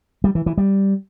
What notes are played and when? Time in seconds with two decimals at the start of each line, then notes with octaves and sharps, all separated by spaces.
0.24 G3
0.35 E3
0.46 E3
0.58 G3